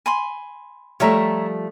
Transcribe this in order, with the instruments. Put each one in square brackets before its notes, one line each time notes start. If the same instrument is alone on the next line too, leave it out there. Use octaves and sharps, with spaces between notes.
[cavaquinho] G#5 B5 C6
[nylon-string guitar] F3 G3 A3 [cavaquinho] C#5 E5 A#5